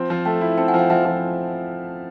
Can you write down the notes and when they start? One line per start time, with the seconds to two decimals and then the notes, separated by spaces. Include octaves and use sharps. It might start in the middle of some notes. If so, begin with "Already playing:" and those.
Already playing: F3 C4
0.10 F3
0.25 A3 G5 A5
0.41 E4
0.58 C4 G5 A5
0.68 F#5 G#5
0.74 F3
0.79 F5 G5
0.90 F3 E5 F#5
1.05 F3